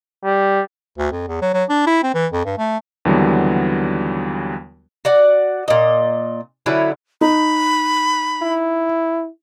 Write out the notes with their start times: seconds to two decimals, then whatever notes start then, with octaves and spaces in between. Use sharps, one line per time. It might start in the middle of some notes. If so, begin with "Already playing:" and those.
0.25 G3
0.98 D2
1.12 F2
1.28 E2
1.42 F#3
1.54 F#3
1.69 D4
1.87 E4
2.03 C4
2.14 E3
2.33 F2
2.45 G2
2.58 A3
3.05 D#2 D3 E3 F#3 G3 B3
5.05 F#4 D5 F#5
5.68 A#2 D#5
6.66 D3 F#3 C#4 E4
7.21 D#4 B5
8.42 E4